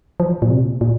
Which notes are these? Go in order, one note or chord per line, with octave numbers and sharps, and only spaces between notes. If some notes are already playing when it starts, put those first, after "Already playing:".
F3
A#2
C3
A#2